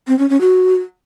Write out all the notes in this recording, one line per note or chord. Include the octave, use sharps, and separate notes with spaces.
C4
C#4
C#4
F#4